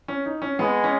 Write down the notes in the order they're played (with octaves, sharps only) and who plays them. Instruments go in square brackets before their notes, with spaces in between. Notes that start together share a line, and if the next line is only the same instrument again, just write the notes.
[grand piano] C#4
D#4
C#4
[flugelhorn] G#3 [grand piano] B3
[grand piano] C#4